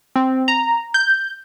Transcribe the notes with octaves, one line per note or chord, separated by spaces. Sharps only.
C4
A#5
G6